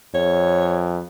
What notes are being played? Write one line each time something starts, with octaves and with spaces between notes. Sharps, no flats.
F2 C#5